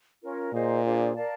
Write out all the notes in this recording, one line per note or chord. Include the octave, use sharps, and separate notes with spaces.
C#4 F4 A#4
A#2 D#4 G#4 C5 D#5
D4 F4 G#4 C5
A#4 D5 F5 A5